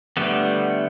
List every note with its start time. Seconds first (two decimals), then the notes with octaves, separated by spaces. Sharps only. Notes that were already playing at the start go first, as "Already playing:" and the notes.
0.17 D3 G3 A3 B3